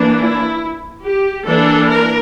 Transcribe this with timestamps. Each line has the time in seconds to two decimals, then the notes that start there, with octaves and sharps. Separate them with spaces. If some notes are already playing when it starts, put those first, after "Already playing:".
Already playing: E3 A#3 D4
0.19 E4
1.03 G4
1.46 E3 A#3 D4 A4
1.88 A#4